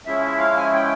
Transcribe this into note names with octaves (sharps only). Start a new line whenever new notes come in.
F3 G#3 C#4 E4 E5
E5
F5
G#5
G5